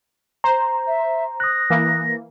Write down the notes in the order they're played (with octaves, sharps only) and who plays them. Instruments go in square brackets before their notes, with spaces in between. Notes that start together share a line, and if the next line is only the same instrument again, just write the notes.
[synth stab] C5 [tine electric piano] A#5
[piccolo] E5
[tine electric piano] D#6 F#6 [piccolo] A#6
[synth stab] E3 A#3